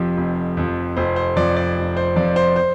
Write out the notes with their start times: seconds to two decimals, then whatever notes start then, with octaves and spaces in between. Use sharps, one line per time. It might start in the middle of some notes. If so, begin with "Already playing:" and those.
Already playing: F1 F2 F3 G4
0.17 F1
0.57 F2 F3
0.97 F1 C5
1.16 C5
1.36 F2 F3 D5
1.56 D5
1.77 F1
1.97 C5
2.16 F2 F3 D5
2.36 C5
2.56 C5